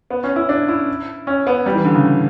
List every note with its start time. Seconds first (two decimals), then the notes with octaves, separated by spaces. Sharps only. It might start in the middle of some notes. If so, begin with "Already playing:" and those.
0.10 B3
0.24 C#4
0.36 E4
0.49 D4
0.68 E4
1.27 C#4
1.47 B3
1.66 G3
1.75 E3
1.85 D3
1.95 C#3